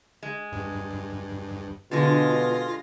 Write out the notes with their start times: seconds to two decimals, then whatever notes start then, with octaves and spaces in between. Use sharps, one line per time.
0.23 G#3
0.52 G2
1.91 B2 D3 G#3 F4 A#6